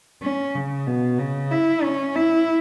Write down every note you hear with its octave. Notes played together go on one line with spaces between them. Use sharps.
C#4
C#3
B2
C#3
E4
C#4
E4